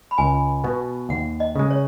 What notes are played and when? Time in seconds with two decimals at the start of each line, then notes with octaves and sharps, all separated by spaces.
0.11 B5
0.18 C#2 G#5
0.64 B2 B3 F#4
1.09 D#2 F#5
1.40 D#5
1.56 C#3 G#3
1.70 C#5